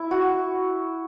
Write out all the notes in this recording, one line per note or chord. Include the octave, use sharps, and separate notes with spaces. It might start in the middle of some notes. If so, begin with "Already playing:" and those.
Already playing: E4
F#4